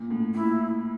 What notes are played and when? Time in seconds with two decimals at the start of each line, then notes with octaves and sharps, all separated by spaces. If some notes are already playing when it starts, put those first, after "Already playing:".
Already playing: A#2
0.10 A2
0.34 A#2 E4